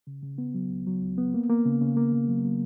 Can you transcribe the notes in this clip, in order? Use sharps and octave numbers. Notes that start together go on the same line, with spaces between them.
C#3
C#3
B3
F#3
C#2
F#3
C#2
B3
A#3
A#3
C#3
C#3
A#3
C#3
F#3
F#3